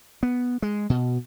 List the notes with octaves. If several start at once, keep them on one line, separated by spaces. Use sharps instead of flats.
B3
G#3
B2